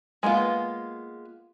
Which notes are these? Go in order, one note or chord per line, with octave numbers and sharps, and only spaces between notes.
G#3 A#3 B3 F4